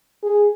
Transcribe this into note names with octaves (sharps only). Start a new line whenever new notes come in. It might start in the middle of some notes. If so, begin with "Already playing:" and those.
G#4